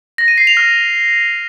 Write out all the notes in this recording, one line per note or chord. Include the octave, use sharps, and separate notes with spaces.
A#6
D#7
C7
F7
F6